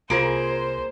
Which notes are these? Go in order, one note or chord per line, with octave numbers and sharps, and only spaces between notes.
C2 A#3 F4 G#4 A#4 C5 D7